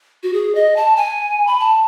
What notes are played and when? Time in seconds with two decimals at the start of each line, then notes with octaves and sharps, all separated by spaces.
0.23 F#4
0.33 G#4
0.55 D#5
0.76 A5
0.96 G#5
1.47 B5
1.60 A5